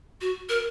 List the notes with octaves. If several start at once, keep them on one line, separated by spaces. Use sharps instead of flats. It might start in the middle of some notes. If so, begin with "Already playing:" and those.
F#4
A#4